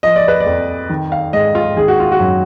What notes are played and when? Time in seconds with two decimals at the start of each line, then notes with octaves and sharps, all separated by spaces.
0.03 F3 D#5
0.16 D5
0.28 B4
0.40 D5
0.46 F2
0.90 D#3
1.12 F5
1.33 G#2 D#5
1.55 F4
1.77 D#3 G#4
1.88 F#4
2.00 F4
2.12 F#4
2.20 F#2